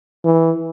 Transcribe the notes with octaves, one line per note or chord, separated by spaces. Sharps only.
E3